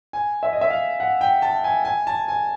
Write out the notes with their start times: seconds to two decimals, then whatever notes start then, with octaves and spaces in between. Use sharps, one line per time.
0.13 G#5
0.43 E5
0.53 D#5
0.61 E5
0.70 F5
1.00 F#5
1.21 G5
1.42 A5
1.64 G#5
1.85 G#5
2.07 A5
2.28 G#5